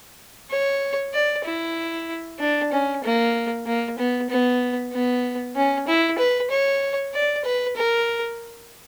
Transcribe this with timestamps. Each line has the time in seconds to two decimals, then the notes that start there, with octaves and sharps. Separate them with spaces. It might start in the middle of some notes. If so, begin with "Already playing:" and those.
0.51 C#5
1.14 D5
1.45 E4
2.40 D4
2.72 C#4
3.04 A#3
3.66 A#3
3.98 B3
4.30 B3
4.93 B3
5.56 C#4
5.88 E4
6.19 B4
6.51 C#5
7.14 D5
7.45 B4
7.77 A#4